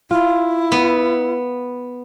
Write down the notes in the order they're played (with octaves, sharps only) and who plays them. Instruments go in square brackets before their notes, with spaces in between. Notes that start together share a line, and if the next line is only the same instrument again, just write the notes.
[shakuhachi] E4 [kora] F4
[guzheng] B3